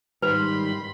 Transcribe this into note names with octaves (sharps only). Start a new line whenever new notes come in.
G#2 D#3 G3 B4 B5 C6